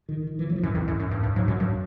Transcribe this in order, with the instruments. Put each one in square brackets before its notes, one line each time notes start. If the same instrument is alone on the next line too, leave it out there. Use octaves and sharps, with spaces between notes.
[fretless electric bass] D#3
D#3
E3
F#3
F3
[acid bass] F#2 [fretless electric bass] E3
[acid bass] F2
F#2
F#2
G2
G2
[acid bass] G#2 [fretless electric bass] F#3
[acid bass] F#2 [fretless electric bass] F#3
[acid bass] G2 [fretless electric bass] F#3